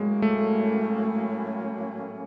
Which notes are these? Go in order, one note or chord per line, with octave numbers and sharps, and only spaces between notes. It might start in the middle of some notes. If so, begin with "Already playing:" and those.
Already playing: A2 F#3 G#3 A#3 C#4
A3